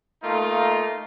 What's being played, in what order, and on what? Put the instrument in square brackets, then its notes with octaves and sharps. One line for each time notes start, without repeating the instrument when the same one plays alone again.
[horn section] A3 A#3 D#4 F4